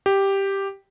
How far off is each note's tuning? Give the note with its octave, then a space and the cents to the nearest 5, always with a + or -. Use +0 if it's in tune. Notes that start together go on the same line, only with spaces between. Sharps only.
G4 +0